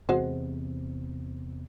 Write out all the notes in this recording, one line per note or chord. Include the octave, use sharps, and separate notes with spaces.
E2 C3 G#3 F#4 C5